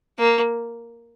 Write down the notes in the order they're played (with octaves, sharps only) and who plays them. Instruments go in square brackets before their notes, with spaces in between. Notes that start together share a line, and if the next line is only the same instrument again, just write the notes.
[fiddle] A#3